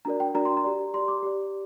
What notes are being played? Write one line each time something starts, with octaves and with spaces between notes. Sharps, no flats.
D4 F#4 A#4 D5 A#5
G5
D4 F#4 A#4 D5 A#5
C6
A#5
G4 D5
G4 D5 C6
D6
G4 D5